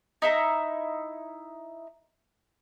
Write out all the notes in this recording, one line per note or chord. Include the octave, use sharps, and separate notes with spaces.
D#4 E4 E5 A#5